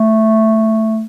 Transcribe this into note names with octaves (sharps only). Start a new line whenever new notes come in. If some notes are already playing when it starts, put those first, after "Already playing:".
Already playing: A3